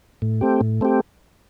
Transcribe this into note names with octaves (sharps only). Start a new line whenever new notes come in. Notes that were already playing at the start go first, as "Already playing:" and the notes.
A2
A3 C4 G4
A2
A3 C4 G4